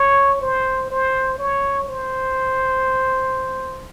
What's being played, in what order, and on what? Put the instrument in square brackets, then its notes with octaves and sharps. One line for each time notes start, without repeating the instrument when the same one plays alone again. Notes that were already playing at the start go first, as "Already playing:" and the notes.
Already playing: [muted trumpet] C#5
C5
C5
C#5
C5